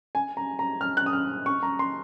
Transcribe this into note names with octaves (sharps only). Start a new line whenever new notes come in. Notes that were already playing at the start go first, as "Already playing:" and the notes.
G#5
A#5
A#5
F6
F#6
D#6
F6
C#6
A#5
C6